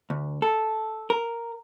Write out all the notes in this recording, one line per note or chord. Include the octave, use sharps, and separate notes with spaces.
D2
A4
A#4